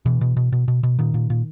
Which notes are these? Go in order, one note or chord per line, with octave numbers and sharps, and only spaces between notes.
B2 E3
B2
B2
B2
B2
B2
A#2 D#3
A#2
A#2